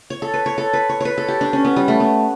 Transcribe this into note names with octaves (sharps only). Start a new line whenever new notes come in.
C#5
A4
B4
C#5
A4
B4
C#5
B4 C#5
A4
G4
D4
C#4
B3
G3
A3
B3